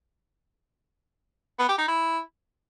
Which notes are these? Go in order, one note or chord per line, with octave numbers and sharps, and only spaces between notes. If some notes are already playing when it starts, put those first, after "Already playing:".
B3
G4
D#4
E4